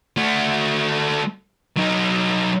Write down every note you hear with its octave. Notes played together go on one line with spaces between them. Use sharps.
A3 F#4
F#3 D#4